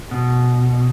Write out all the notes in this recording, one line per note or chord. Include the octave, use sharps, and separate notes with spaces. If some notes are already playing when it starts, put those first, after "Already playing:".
B2